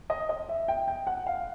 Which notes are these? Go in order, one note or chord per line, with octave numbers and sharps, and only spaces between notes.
D#5
D#5
E5
G5
G5
F#5
F5